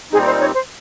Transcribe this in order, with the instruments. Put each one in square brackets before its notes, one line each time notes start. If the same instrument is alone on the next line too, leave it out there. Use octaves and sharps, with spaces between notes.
[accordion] A#2 G3 C4 D#4 [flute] G#4
[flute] C5
C#5
C5